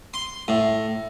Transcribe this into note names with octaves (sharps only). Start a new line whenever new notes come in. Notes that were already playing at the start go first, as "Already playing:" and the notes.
C6
A2